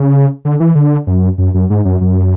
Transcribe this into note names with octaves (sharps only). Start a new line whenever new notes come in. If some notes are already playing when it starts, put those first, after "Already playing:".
Already playing: C#3
D3
E3
D3
F#2
F#2
F#2
G#2
F#2
F#2